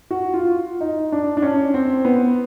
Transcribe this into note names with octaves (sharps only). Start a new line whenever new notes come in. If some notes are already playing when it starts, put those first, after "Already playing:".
F#4
F4
D#4
D4
D4
C#4
C4
B3